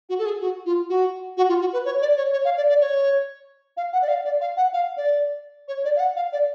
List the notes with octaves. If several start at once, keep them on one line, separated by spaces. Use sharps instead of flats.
F#4
A4
G#4
F#4
F4
F#4
F#4
F4
F#4
B4
C#5
D5
C#5
C#5
F5
D5
D5
C#5
F5
F#5
D5
F5
D5
F5
F#5
F5
D5
C#5
D5
F5
F#5
F5
D5